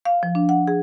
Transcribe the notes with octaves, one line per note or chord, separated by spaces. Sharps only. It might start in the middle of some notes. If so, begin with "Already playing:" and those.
F5
F3
D4
F#5
G#4